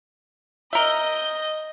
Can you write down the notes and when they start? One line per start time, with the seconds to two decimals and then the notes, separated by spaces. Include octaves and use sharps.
0.73 A#4 D#5 E5 G6